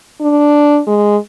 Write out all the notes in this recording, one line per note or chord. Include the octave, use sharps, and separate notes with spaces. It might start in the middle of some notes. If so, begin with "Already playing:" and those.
D4
G#3